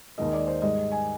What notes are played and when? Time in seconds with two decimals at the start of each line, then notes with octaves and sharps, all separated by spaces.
0.18 D#2 D#3 G#3 D#5
0.33 D5
0.47 C5
0.62 G#2 G3 D#5
0.92 G#5